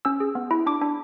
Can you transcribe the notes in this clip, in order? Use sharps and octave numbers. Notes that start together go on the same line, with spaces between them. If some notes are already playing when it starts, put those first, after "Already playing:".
C#4 E6
G#4
B3
E4
D4 D6
D4